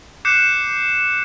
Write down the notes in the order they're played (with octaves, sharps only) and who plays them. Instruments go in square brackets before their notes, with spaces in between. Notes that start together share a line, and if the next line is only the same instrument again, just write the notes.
[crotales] D6 F#6 G6 C7 C#7 E7